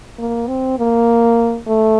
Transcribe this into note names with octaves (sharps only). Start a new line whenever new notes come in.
A#3
C4
A#3
A3